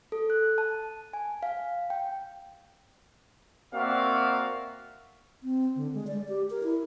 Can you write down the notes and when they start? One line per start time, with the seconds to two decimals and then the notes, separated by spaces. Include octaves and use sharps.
0.12 A4
0.30 F#6
0.58 A5
1.13 G#5
1.43 F5
1.90 G5
3.73 A#3 C4 F#4 D5 E5 F5
5.43 C4
5.76 D3
5.94 G#3
6.07 D5
6.29 G4
6.50 A#4
6.64 E4